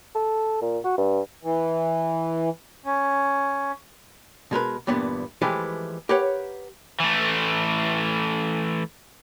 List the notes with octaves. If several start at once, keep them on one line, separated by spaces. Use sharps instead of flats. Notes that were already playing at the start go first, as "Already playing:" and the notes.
A4
A#2
F#4
G2
E3
C#4
B2 G#3 A#4 B4
E2 G2 A#2 B3
E3 F3 G#3 A3 G4 B4
G4 A#4 B4 C#5 F#5
E3 A3